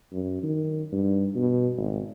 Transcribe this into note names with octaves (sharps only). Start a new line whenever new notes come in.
F#2
D#3
G2
B2
G#1